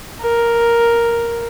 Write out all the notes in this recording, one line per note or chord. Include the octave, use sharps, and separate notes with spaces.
A#4